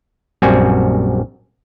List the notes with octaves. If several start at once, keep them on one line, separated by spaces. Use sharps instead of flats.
A#1 F#2 G3 C4 F#4 G#5